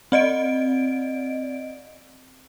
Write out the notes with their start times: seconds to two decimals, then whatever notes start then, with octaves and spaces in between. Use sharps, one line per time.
0.12 C4 D5 D#5 D7